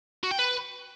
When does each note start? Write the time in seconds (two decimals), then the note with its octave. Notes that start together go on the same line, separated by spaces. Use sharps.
0.24 F#4
0.31 G5
0.39 B4